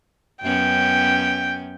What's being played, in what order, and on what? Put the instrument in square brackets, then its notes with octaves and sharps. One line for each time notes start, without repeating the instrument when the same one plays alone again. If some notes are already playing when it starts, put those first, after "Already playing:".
[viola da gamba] F#2 B3 C#4 [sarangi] G5